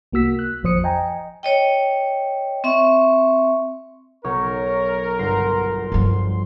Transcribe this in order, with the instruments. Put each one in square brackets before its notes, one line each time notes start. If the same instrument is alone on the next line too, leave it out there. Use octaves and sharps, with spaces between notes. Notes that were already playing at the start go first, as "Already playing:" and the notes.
[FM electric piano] C2 A#3 F#4 E6 B6
F#6
A1 F2 F3 C5 D#6 C#7
D#5 G5 G#5 A#5
[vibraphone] C#5 D#5 G5
C4 E5 C#6
[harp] B1 [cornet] A#4 [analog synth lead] C#5
[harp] G1 [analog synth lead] C6
[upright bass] G2 F3